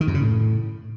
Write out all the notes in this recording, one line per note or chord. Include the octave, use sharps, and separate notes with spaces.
D#3
F#2
C#3
A2